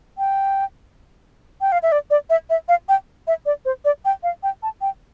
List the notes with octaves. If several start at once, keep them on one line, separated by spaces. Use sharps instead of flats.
G5
G5
F5
E5
D5
D5
E5
E5
F5
G5
E5
D5
C5
D5
G5
F5
G5
A5
G5